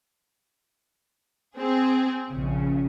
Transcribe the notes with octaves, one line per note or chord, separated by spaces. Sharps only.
C4 G#4
A#1 C#3